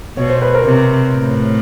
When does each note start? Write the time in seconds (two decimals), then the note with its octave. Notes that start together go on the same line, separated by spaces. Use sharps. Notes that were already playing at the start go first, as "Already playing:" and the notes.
0.17 B2 C#5
0.30 C5
0.42 B4
0.54 A#4 C5
0.64 C3
1.12 A2